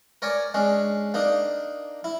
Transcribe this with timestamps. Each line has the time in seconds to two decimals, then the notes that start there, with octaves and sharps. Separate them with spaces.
0.22 A#4 C#5 D5 G#5
0.54 G#3 C#4 D4
1.14 A#3 D4 D#4
2.04 E4